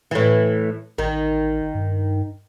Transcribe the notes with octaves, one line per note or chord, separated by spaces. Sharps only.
A2 E3
A1 D#3
G2